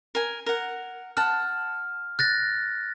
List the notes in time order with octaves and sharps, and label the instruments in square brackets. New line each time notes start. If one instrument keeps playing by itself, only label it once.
[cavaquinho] A#4 G#5
A#4 F#5
[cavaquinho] F#5 A5 [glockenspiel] F6
[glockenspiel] F#6 A6 A#6